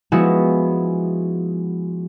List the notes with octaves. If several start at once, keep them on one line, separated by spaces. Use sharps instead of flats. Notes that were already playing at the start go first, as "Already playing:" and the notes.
F3 G#3 B3 E4 F#4